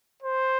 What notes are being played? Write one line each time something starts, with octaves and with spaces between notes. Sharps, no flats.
C5